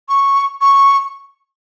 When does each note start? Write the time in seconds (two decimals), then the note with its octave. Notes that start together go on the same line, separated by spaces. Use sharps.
0.09 C#6
0.61 C#6